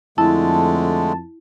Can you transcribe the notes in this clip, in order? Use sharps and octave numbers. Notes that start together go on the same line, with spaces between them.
F2 D3 G#3 A3 E4 A5